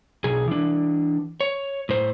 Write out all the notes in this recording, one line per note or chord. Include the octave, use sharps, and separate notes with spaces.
B1 G#4
E3 D4
C#5
A2 C5